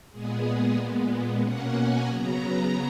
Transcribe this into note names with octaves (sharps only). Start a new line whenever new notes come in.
A#2 G#3 B3 G#4
G#4
A#2 G#3 B3
B2 A#3 C#4 F#5
G#5
C#3 F#3 B3 A#5